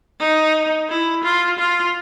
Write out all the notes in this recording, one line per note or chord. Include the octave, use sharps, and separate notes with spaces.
D#4
E4
F4
F4